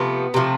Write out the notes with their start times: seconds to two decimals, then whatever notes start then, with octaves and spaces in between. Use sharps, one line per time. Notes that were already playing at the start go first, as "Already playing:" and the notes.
Already playing: C3 F3 A3 B3
0.34 C3 F3 A3